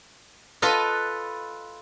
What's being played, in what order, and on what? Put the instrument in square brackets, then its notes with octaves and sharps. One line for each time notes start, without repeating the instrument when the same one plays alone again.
[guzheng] F4 A4 B4 D#5